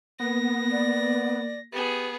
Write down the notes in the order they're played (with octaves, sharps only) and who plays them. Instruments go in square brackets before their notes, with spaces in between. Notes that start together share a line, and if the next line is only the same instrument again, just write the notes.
[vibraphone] A#3 A#4 [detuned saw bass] B3 [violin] A#6
[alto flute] D5
[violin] B3 G#4 [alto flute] G4